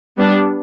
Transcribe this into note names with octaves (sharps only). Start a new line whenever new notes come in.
G3 B3 D4